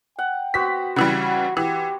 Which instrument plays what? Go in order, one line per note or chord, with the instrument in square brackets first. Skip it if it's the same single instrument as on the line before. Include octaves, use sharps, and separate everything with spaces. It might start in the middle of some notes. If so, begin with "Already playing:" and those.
[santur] F#5 [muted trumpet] G5
[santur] B3 F#4 C5 [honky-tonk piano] B6
[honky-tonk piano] C#3 E3 G3 [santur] F#5
[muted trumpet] F#4
[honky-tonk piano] E3 [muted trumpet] G4